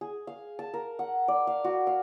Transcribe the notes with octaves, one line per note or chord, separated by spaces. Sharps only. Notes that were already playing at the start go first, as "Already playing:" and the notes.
G#4
F5
A5
A#4
F#5
D5
F5
F#4
F5